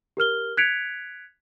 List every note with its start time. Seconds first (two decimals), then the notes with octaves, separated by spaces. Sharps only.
0.17 G4 A#4 F6 G7
0.57 F#6 G#6 B6 C#7 D7 F7